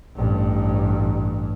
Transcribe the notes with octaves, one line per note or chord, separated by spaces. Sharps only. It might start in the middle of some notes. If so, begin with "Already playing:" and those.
A1 G2